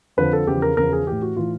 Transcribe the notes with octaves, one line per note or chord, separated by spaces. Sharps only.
F2 D3 F3 B4
A4
E2 C#3 F3 G4
A#4
E2 C#3 F3 A#4
G#4
A2 E3 G4
F#4
A2 E3 F4